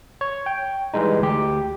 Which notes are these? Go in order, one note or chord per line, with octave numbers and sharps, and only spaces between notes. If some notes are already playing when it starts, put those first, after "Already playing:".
C#5
G5
E3 G3 G#3 D#4
D2 G4